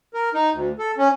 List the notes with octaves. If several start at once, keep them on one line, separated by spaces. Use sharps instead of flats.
A#4
D#4
D2
A4
C#4